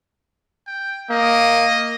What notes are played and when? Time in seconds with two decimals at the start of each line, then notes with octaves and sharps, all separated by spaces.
0.67 G5
1.10 A#3 D#5